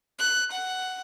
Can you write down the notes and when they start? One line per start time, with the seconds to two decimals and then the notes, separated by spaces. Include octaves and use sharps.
0.19 F#6
0.51 F#5